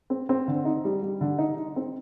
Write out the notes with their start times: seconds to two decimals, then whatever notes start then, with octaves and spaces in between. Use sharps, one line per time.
0.10 C4
0.29 C4
0.48 D3
0.65 D#4
0.85 G3
1.02 G3
1.21 D3
1.39 D#4
1.57 D#4
1.76 C4